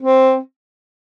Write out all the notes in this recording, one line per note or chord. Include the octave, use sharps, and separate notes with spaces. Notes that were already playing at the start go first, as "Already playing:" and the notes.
C4